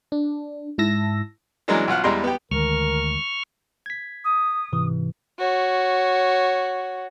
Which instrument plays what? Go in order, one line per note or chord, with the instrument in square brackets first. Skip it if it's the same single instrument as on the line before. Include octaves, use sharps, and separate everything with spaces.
[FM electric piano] D4
G#2 E4 A5 E6 A#6
[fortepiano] E3 F#3 G#3 A#3 D4 A#4
B1 F4 F#5 F6
E2 G3 G#3 A#5 C6
B3 G4
[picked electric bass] D2 [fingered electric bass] D#3 G#3 [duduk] A#4 [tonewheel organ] C#6 F6
[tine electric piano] G#6 B6
[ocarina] D#6
[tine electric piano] G#2 C3 E3
[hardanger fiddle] F#4 C#5